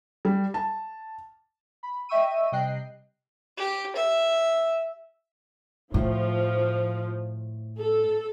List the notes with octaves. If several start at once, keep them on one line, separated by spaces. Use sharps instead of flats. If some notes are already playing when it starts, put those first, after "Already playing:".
G3
A5
B5
D#5 E5 G5 C#6 E6 D#7
C3 G3 D#5 G5 F#6 C7
G4
E5
A2 F3
A4